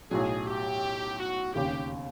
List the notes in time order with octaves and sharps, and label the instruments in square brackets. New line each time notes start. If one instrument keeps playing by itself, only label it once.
[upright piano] B1 A2 F#3 [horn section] G#4
[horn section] G4
F#4
[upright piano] E1 D#2 C#3 [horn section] G4